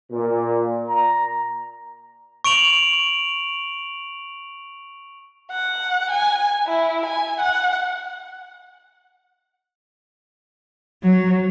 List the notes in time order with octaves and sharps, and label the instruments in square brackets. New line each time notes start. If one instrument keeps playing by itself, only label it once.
[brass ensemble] A#2
A#5
[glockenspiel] C#6 D7 F7 F#7
[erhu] F#5
G#5
E4
G#5
F#5
[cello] F#3